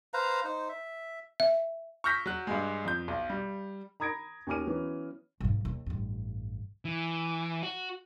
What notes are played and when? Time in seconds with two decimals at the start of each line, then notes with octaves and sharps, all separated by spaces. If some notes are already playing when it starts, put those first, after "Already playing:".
0.14 B4 C5 F5 A#5
0.44 D#4 C5
0.69 E5
1.40 E5
2.04 C#6 E6 F6 G6 A#6 B6
2.26 F#3 F#6
2.47 G2 G#3
2.85 F2 G6
3.08 B1
3.30 G3
4.00 A#5 B5 D#6 G#6 A#6 D7
4.47 D#2 C#4 G#5 D6 F6 D#7
4.67 E3 F#3 B3 C#4
5.40 B1 G#2
5.65 D#2
5.86 A1 G2
6.85 E3
7.63 F#4